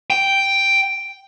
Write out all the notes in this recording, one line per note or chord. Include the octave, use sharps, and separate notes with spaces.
G5